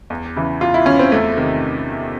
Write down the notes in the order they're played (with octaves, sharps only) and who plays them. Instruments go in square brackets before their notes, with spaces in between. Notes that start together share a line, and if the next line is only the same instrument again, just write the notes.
[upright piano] E2
C#3 E3
E2 F4
E4
C#3 E3 C#4
C4
E2 A3
C3 D#3